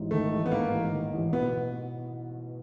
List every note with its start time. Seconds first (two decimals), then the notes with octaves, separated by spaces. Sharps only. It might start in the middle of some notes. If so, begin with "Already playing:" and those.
Already playing: A1 G#2
0.11 D#3 A3
0.31 A1
0.46 B3
0.51 G#2 A#3
0.71 A1
0.92 D#3
1.12 A1
1.33 B2 B3